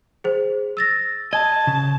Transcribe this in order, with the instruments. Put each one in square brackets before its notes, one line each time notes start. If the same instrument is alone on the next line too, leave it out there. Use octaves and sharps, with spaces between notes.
[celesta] G#4 C5
E6 A6 A#6
[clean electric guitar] D#5 [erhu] A5 [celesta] G#6
[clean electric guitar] C#3